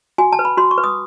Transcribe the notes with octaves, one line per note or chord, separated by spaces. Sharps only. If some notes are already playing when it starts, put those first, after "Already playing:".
F#4 G#5
A5
B4
B5
F#4 C6
C#6
B4
D#6